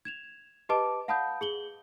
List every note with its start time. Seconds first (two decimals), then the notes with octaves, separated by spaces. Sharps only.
0.05 G#6 E7 F7
0.69 G4 B4 D#5 A5 D6 D7
1.08 F5 F#5 A5 B5 D#6 G6
1.41 G#4 F#7 G7